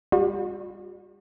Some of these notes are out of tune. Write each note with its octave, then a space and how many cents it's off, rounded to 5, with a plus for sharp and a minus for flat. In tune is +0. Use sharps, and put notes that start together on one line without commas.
G3 +25 F#4 -40